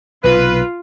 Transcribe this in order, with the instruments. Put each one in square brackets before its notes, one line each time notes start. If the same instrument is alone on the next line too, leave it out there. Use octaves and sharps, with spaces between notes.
[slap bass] B1 C3 [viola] F4 [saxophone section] B4